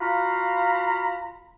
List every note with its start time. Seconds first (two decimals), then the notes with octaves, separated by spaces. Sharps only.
0.01 F4 F#4 F5 A#5 B5